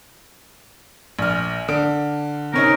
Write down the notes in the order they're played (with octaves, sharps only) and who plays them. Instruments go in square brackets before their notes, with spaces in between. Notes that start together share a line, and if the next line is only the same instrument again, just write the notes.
[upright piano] A#1 F6
D3 D7
[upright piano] C3 C#4 D#4 [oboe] A#4